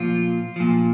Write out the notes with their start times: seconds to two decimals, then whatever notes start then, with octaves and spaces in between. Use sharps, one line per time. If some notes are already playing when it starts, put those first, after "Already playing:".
Already playing: A#2 F3 F4
0.56 A#2 F3